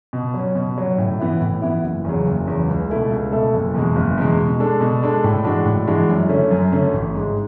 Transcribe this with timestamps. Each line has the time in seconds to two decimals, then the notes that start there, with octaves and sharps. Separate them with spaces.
0.13 B2
0.34 F#3 C#4
0.55 B2
0.78 F#3 C#4
0.98 A2
1.19 E3 B3 E4
1.41 A2
1.62 E3 B3 E4
1.84 F#1
2.04 E2 C#3 F#3
2.26 F#1
2.47 E2 C#3 F#3
2.68 C#2
2.90 B2 A3 E4 A4
3.10 C#2
3.32 B2 A3 E4 A4
3.54 F#1
3.74 E2 B2 G#3
3.96 F#1
4.17 E2 B2 G#3
4.38 B2
4.60 G#3 D4 A4
4.81 B2
5.02 G#3 D4 A4
5.24 A2
5.44 E3 G#3 D4 F#4
5.65 A2
5.87 E3 G#3 D4 F#4
6.09 F#2
6.29 D3 A3 C#4
6.51 F#2
6.72 D3 A3 C#4
6.93 A1
7.14 G#2 G#3